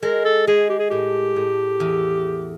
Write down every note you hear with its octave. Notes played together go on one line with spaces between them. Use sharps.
G#3 A#4
A4
G#3 G#4
G4
G#4
A2 G4
A2
E2